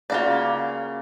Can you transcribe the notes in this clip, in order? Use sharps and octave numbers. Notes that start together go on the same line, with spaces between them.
C#3 A#3 F4 F#4 D5